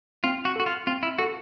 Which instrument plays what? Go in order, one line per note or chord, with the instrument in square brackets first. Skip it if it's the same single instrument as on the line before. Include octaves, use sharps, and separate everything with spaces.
[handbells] C4 [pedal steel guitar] F4
[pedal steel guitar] F#4
[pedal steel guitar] F#4 [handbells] A4
[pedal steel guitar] F4
[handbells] C4 [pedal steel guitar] F4
[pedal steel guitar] E4
[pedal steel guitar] F#4 [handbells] A4